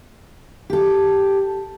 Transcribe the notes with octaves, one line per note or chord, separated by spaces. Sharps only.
G4 A4